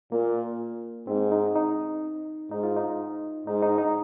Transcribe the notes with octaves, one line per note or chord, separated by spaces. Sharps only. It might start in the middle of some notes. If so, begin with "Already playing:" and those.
A#2 A#3
G#2 C4
D#4
D#4
G#2 D#4
F4
D#4
G#2 D#4
D#4
D#4